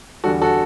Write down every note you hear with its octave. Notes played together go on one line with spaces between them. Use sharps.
E2 D3 G3 F#4 A4
F#4 A4